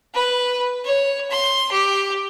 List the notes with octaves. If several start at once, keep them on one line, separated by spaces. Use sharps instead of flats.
B4
C#5
C6
G4